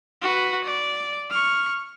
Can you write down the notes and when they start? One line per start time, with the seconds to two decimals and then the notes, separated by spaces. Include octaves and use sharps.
0.22 F#4 B4
0.64 D5
1.30 C#6 F6